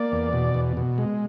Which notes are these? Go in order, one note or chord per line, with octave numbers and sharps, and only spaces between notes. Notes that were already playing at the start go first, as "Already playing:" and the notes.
Already playing: A#3 D5
E2
B2
E2
B2
G#3